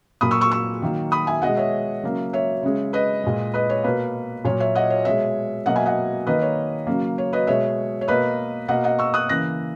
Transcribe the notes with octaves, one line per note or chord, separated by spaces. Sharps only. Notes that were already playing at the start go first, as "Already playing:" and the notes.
A#2 F#3 A#3 B5 D#6
C#6 E6
C#6 E6
C#6 E6
D#3 F#3 A#3
B5 D#6
E5 G#5
B2 G#3 D#5 F#5
C#5 E5
C#3 F#3 A#3
C#5 E5
C#3 G#3
B4 D#5
A#2 G#3
B4 D#5
C#5
B2 A#3 B4
A#2 F#3 A#3 C#5
C#5 E5
D#5 F#5
C#5
B2 G#3 C#5 E5
B2 F#3 A#3 D#5 F#5
E5 G#5
D#5 F#5
D#3 A#3 B4 D#5
C#5
C#3 F#3 A#3
C#5
B4 D#5
B2 G#3 C#5 E5
C#5
B2 A#3 B4 D#5
B2 A#3 D#5 F#5
D#5 F#5
C#6 E6
D#6 F#6
C#3 E3 A#3 F#6 A#6